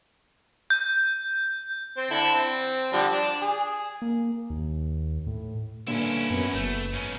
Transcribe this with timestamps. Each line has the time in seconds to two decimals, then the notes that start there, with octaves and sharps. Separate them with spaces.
0.70 G6
1.97 C4 C5
2.11 D3 E4 A4
2.34 C4
2.92 D3 F3 G3
3.12 D4
3.41 G#4
4.02 A#3
4.50 D#2
5.27 A2
5.87 G2 A#2 D3 C#4 E4
6.30 F#2 B3
6.54 F#1 A3
6.94 G#2 C#4